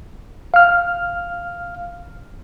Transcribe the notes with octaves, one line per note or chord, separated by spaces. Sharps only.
F5 F6